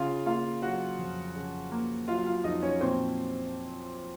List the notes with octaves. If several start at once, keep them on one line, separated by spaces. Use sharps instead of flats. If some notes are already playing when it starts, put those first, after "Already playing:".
Already playing: C#3 F4 F5
A#3 F4 F5
F#3 F#4 F#5
F2
C#3
A#3
F#3 F4 F5
F4 F5
F2 D#4 D#5
C#4 C#5
A#2 C4 C5